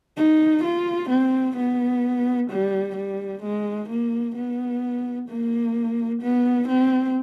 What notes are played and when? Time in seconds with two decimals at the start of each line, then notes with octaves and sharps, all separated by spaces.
0.17 D#4
0.63 F4
1.10 C4
1.56 B3
2.50 G3
2.96 G3
3.43 G#3
3.89 A#3
4.35 B3
5.29 A#3
6.22 B3
6.68 C4